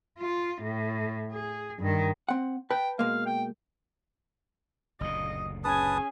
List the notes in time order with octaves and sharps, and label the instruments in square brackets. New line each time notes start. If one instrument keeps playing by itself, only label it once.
[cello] F4
A2
G#4
G2 D#3
[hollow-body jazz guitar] C4 F#5
[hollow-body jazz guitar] B4 A5 [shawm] G5
[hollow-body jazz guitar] B2 G#3 A#3 [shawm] F5
[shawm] G5
[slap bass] F#1 D2 A#2 [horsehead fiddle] D#5
[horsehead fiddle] C#4 G#4 [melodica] B4 A5 D#6 [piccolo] G#5